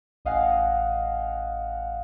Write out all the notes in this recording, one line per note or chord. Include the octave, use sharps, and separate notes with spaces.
A1 D#5 F5 F#5 G#5